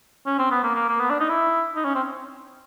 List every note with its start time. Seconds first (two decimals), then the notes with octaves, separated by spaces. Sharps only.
0.26 C#4
0.39 C4
0.51 B3
0.64 A#3
0.75 A#3
0.89 A#3
1.00 B3
1.10 D4
1.20 D#4
1.29 E4
1.76 D#4
1.85 C#4
1.95 C4